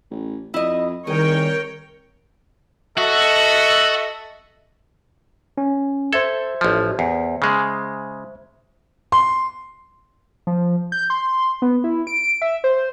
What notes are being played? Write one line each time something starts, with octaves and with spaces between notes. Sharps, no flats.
A1
F2 E4 D#5
C2 D#3 G#4 A#4 C#5 G5
F#4 A4 D#5 E5
C#4
A4 C5 E5 G#6
A1 F3
E2
C#3 G#3
C6
F3
G6
C6
B3
E4
D7
E5
C5